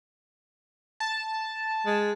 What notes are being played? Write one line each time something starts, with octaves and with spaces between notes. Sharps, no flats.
A5
G#3